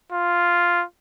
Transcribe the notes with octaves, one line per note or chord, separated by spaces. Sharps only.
F4